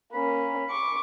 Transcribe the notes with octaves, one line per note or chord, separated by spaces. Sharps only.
A#3 C#4 B5
C#6 D6